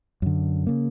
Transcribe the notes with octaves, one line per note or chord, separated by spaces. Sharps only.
F#2 D3
C#3 A#3